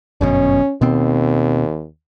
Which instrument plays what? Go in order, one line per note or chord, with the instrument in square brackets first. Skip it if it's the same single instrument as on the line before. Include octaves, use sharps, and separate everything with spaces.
[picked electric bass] G1 F#2 B2 [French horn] C#4
[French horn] D#2 [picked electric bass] B2 B3 C4